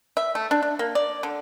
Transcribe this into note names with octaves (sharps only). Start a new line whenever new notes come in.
E5
A3
D4
D4
A#3
D5
D3